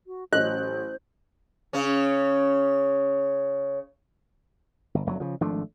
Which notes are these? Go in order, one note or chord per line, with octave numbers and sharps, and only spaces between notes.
F#4
A1 F#3 C#4 C5 D#5 F#6
C#3 C#4
G1
F1 F#3
C#3 F3
G#1 F3 A3 D4